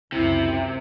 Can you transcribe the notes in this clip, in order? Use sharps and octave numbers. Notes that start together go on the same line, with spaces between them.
C#2 F#2 C3 E4